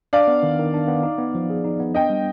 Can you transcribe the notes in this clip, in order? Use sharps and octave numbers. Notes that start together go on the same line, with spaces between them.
D4 D5 F5
B3
D#3
D#3
D4
B3
D#4
B3
F3
G#4
D#4
B3
D4 D#5 G5
G3